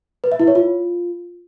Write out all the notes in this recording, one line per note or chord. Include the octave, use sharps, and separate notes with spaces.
B4
E5
E4
C#5
F4